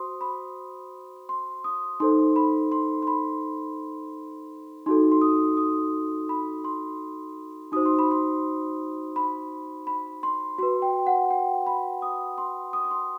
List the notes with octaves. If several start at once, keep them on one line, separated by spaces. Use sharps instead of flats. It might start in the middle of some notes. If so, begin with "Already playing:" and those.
Already playing: F#4 C5 C6 D#6
B5
C6
D#6
D#4 A4 C5 C6
B5
C6
C6
B5
D#4 F#4 A4 C6
C6
D#6
D#6
B5
C6
D#4 F#4 C5 D#6
C6
B5
C6
B5
B5
C6
F#4 B4 C6
G5
F#5
G5
B5
D#6
C6
D#6
D#6
C6